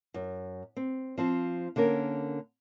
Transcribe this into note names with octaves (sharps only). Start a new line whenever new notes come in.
F#2
C4
F3 C4 F4
D3 A#3 C#4 A#4